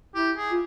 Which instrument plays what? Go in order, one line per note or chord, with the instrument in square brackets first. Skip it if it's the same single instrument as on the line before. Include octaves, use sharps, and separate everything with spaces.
[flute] E4 [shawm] G4
[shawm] G#4
[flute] F4